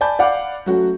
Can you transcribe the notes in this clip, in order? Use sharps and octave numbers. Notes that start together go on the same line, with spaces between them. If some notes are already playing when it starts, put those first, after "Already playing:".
D5 G#5 A5 B5 G6
D5 F5 F#5 B5 D6
F#3 A3 C#4 F#4